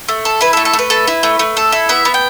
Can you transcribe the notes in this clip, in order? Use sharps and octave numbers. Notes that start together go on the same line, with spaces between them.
A3
A4
E4 B4
A4
A3
A4
A3
B4
A4
E4
A3
A3
A4
E4
B3 E5
B3
G5